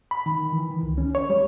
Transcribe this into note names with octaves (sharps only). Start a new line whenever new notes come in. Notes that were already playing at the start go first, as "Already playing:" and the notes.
B5
D#3
E3
D#3
C#2
C#4
C#5
G3